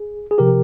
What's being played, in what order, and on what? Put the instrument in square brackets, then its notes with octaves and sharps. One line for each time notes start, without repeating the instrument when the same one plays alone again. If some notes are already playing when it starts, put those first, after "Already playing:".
Already playing: [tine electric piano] G#4
G#4
C3 F3 G4 A#4